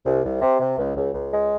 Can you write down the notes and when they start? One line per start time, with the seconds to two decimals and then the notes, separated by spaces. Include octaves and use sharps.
0.05 C2
0.25 C2
0.42 C3
0.60 C3
0.78 C#2
0.96 C#2
1.14 C#2
1.32 G#3